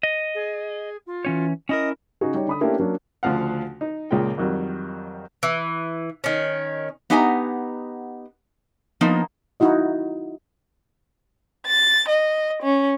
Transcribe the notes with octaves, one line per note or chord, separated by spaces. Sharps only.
D#5
G#4
F4
E3 C#4 C#5
C#4 E4 A#4 D#5
C#3 D#4 F#4 G#4
G3 D#4 C#5
D3 B5 D#6
A3 A#3 C#4 D4 E4 G4
F#3 A#3 C#4 D4
D2 C#3 F3 F5 F#5
D#4
C#2 A#2 G#4 G5
F2 D#3 F#3 G3
E3
D#3 C#4
B3 D#4 G4 F#5 G#5 A#5
F3 A#3 B3 D#4
D#4 E4 F#4 D#5
A6
D#5
C#4